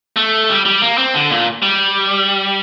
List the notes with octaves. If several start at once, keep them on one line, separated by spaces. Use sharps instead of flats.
A3
G3
G3
A#3
C4
D3
A#2
G3